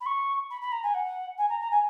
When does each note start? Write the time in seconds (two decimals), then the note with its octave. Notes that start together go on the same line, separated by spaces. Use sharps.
0.01 B5
0.06 C#6
0.51 B5
0.62 B5
0.72 A#5
0.83 G#5
0.94 F#5
1.38 G#5
1.49 A#5
1.60 A#5
1.71 G#5